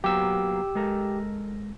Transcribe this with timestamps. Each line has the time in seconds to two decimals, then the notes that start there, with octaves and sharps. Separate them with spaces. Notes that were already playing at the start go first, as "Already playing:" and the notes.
0.04 F#3 A#3 B3 G4 E6
0.75 G#3 A4 A#4